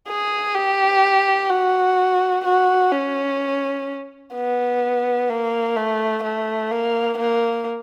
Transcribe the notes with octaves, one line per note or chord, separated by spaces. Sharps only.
G#4
G4
F#4
F#4
C#4
B3
A#3
A3
A3
A#3
A#3